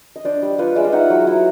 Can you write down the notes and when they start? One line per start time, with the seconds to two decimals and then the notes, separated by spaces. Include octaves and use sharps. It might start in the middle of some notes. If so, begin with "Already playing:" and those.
0.16 D#5
0.25 D4 C5 D5
0.42 G3
0.58 F4 B4 C#5
0.75 G#3 D5 E5
0.84 D#5 F5
0.92 D#4 E5 F#5
1.10 F#3
1.27 E4